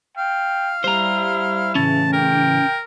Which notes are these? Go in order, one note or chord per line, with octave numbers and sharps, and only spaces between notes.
F5 G5
G3 E4 C5 A#5
A2 C#3 E3 C#4 A5
A#4 G5